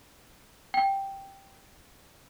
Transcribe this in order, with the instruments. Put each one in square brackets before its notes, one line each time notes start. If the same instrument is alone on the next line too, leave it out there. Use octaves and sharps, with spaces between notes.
[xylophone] G5